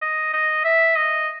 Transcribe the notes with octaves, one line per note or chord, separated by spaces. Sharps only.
D#5
D#5
E5
D#5